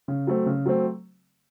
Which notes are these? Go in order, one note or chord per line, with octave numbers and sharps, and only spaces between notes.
C#3
F#3 A3 C4
C#3
F#3 A3 C4